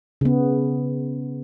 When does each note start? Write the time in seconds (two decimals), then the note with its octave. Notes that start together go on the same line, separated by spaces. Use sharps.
0.21 C#3 B3